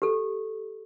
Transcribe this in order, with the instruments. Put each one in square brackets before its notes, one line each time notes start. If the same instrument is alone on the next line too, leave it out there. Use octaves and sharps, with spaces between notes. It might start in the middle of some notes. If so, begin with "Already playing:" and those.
[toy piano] G4 A4